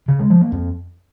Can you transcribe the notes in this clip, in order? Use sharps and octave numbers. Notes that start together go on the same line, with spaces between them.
C#3
G#3
F3
A#3
F2